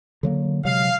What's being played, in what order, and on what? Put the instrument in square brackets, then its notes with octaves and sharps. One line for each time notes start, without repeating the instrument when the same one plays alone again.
[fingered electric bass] D3 F#3 A#3
[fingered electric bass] C3 F#3 G#3 [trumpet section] F5